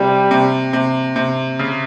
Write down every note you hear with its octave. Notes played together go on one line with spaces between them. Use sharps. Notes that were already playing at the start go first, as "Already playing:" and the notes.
Already playing: C3 G3
C3
C3
C3
C#3